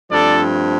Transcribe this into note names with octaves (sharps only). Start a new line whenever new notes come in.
G2 F3 A3 C4 A4 D5